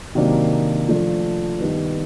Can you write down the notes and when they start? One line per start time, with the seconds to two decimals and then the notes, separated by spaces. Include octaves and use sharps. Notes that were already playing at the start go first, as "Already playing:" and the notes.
0.15 C3 D#3 F#3 A#3 D4
0.88 F3 A3 D4
1.61 G2 D#3 G3 B3 D#4